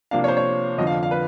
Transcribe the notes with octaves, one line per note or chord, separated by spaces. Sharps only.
C3 F3 A#3 D4 F5
C#5
C5
C#5
F2 D3 F3 D#5
F5
F5
B4